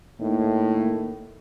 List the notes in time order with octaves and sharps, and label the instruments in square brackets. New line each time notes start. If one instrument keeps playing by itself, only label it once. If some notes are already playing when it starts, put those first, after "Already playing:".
[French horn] A2 [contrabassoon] D#3 [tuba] A#3